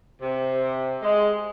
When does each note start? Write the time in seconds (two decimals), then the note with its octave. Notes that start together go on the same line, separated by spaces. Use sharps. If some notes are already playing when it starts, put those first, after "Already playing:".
0.21 C3
1.02 G#3